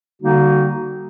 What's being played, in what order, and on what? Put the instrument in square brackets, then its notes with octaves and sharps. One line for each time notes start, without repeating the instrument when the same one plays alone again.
[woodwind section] D3 G3 A#3 D#4 F#4